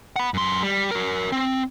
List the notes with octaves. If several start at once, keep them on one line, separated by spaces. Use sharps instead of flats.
F#5 B5
F#2 C6
G3
F#4 A#4
C4